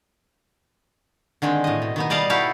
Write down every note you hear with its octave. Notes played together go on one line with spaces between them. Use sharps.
D3 D#3 G#3 C4
A2 D#5
B2
D#3 B3 D#4
G3 D5 D#5 F5 A5
D#4 E4 F#4 G4 A4 F5